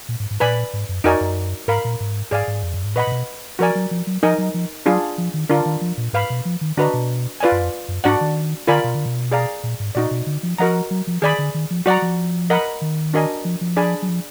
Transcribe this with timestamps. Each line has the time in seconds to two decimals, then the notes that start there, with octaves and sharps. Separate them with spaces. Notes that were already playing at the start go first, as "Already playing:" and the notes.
0.09 A#2
0.20 G#2
0.31 G#2
0.40 A#2 B4 D5 G#5 B5
0.73 G#2
0.89 F#2
1.04 F2 D#4 F#4 A#4 D5 G#5
1.21 F#2
1.68 G#2 A#4 F5 B5
1.85 A#2
2.00 G#2
2.31 G#2 G#4 D5 F5 G#5
2.48 G#2
2.63 F2
2.74 F#2
2.84 G#2
2.95 A#2 B4 D#5 F#5 B5
3.07 A#2
3.12 B2
3.59 F3 F#4 A#4 D5 G#5
3.75 F#3
3.91 F3
4.07 F#3
4.23 F3 D#4 A#4 D#5 G#5
4.38 F#3
4.54 F3
4.86 F#3 D4 F4 G#4
5.18 F3
5.34 D#3
5.50 D3 D4 F4 A#4
5.66 D#3
5.81 F3
5.98 A#2
6.13 G#2 B4 F5 B5
6.30 B2
6.45 F3
6.61 D#3
6.77 D3 D4 F#4 B4 D#5 A#5
6.93 B2
7.40 F4 B4 D5 G#5
7.52 F#2
7.62 F2
7.88 F#2
8.04 G#2 D4 F#4 D5 F#5
8.21 D#3
8.67 D3 F4 A#4 D5 G#5 B5
8.84 B2
8.95 D3
9.06 B2
9.32 G#4 D5 F5 A#5
9.63 A#2
9.80 G#2
9.95 A#2 D#4 F#4 D5
10.11 B2
10.27 D3
10.43 F3
10.58 F3 F#4 A#4 D#5 F#5 A#5
10.91 F#3
11.07 F3
11.22 D#3 G#4 D5 G#5 B5
11.38 D3
11.54 D#3
11.71 F3
11.86 F#3 F#4 D5 F#5 A#5
12.02 F3
12.50 A#4 D#5 F#5 B5
12.81 D#3
13.14 D4 F#4 A#4 D#5 G#5
13.45 F3
13.61 F3
13.77 D4 G#4 D5 G#5 B5
14.02 F#3
14.09 F3